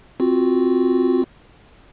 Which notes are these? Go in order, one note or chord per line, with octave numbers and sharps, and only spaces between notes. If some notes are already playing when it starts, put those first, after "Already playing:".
C4 F4 F#4